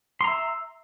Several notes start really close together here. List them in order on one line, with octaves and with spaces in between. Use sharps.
C6 A#5 E5